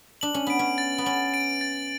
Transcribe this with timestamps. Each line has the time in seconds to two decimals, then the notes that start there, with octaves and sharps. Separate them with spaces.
0.21 D4 F#7
0.34 C#4
0.47 B3 D7
0.59 C#4
0.78 A6
0.98 B3
1.06 C#4 F#7
1.34 D7
1.61 A6